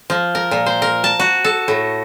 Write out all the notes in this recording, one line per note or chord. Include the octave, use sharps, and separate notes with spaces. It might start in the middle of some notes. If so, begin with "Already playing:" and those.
F3
A#4
A#2
C5
A#4
A5
F#4
A4
A2